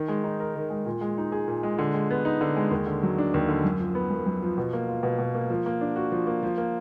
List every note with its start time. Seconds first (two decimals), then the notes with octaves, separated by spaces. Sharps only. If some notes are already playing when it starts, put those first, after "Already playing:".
Already playing: D#3
0.08 G#3
0.24 D#4
0.40 A#4
0.56 D#3
0.70 G#3
0.86 A#2
1.01 G#3
1.18 D#4
1.32 G#4
1.48 A#2
1.63 G#3
1.78 D3
1.94 G#3
2.11 B3
2.25 D#4
2.41 D3
2.57 G#3
2.71 D#2
2.87 D3
3.03 F#3
3.18 D4
3.34 D#2
3.49 D3
3.64 F#2
3.79 F3
3.95 B3
4.10 F#2
4.26 F#2
4.42 F3
4.58 B2
4.73 A#3
4.89 F4
5.03 B2
5.18 B2
5.35 A#3
5.50 F3
5.66 A#3
5.81 D4
5.96 F#4
6.12 F3
6.27 A#3
6.43 F3
6.58 A#3